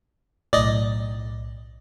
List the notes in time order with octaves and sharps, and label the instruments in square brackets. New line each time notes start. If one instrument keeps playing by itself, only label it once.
[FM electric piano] B1 A2 [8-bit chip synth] D5 D#5